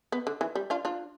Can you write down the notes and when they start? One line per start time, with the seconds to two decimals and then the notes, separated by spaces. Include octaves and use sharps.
0.12 B3
0.27 D3
0.41 E3
0.55 G3
0.70 D4 F4
0.85 D4 F4